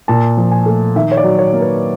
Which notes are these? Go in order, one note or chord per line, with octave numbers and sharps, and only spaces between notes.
A#2 A5
F3
G#5
A3
D#3 E5
C#5
D5
F#3
C#5
A#3
B4